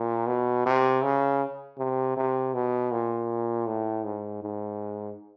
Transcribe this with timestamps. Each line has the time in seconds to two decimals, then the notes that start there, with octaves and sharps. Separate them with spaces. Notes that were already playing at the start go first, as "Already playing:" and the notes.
Already playing: A#2
0.28 B2
0.66 C3
1.03 C#3
1.78 C3
2.17 C3
2.54 B2
2.92 A#2
3.67 A2
4.04 G#2
4.43 G#2